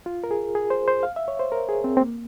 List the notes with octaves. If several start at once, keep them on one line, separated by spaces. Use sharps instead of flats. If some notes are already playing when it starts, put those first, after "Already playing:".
F4
A#4
G#4
G#4
C5
C5
F5
E5
C#5
C5
A#4
G#4
C4
C4
A#3